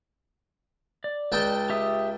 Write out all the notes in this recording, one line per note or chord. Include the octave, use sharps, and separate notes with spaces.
D5
C#2 G5 A5
G4 E5 D#6